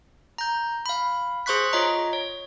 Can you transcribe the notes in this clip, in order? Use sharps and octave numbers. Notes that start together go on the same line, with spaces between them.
A#5 G6
F5 B5
G#4 C5 C6 C#6 F#6 B6
F4 C#5 D#5 A#5
C#5